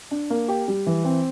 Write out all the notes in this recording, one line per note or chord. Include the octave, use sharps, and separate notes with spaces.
D4
A#3
G4
G3
E3
C4